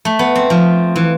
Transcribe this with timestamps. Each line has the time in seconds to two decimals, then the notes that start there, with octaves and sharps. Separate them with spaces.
0.05 A3
0.19 B3
0.35 C4
0.50 F3
0.96 E3